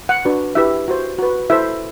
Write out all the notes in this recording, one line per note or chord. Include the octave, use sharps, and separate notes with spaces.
F#5
D4 F#4 B4
E4 G4 B4 E5
F#4 C5
F#4 B4
E4 A4 C5 E5